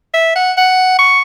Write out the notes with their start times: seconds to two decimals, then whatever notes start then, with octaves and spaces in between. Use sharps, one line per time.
0.14 E5
0.36 F#5
0.57 F#5
0.99 C#6